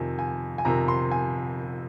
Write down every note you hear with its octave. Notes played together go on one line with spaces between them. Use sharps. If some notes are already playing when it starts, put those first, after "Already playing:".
Already playing: F2 C3 D#3 G#5
G#5
G#5
F2 C3 D#3 A#5
C6
G#5